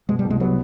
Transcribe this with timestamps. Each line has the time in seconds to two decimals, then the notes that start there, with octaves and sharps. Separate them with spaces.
0.09 B2 G#3
0.19 G3
0.25 C2
0.30 G#3
0.40 F#3 B3